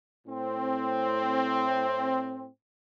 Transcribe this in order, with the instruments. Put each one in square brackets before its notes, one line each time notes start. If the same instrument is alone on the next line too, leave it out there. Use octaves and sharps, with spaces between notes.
[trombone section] A2 C4